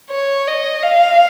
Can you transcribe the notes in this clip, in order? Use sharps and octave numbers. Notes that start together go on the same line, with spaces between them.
C#5
D#5
F5